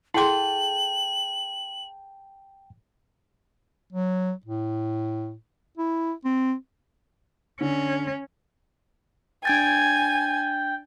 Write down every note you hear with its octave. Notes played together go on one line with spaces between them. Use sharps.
E4 G#4 A4 F#5 G5 A5 C6 F#7
F#3
A2
E4
C4
D3 C#4
D4 G5 G#5 G#6 A6